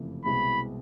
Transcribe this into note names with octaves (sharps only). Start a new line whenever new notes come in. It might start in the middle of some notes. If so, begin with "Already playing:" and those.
Already playing: F#1 F2 C3 E3 A3
C2 B2 G#3 C4 E4 B5